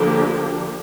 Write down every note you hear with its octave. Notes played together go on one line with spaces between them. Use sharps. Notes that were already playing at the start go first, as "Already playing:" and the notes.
Already playing: D3 F3 A#3 D4 G4